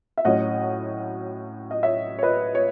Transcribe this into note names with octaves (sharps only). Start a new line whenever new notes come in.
E5
A2 F#3 C#4 D#5 F#5
D#5
C#5 E5
C#5
B4 D#5
C#5